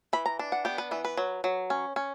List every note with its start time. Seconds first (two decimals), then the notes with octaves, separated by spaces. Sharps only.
0.13 E3 B5
0.26 A#5
0.39 D4
0.52 F#5
0.65 B3 G4
0.78 B4
0.91 E3 B4
1.05 B4
1.17 F#3
1.44 F#3
1.70 C#4
1.96 C#4